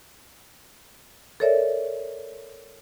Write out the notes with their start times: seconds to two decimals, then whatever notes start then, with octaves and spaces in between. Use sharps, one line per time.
1.40 A4 A#4 C#5 D5 E5